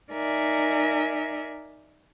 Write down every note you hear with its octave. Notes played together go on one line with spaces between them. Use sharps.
D#4 A#4 D5 E5 G#5